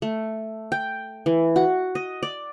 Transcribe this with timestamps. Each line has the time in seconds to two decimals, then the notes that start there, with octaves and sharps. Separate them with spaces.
0.02 A3
0.72 G5
1.26 E3
1.56 F#4
1.95 D#5
2.23 D5